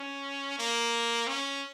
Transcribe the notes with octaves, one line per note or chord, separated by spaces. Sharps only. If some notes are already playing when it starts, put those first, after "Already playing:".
Already playing: C#4
A#3
C#4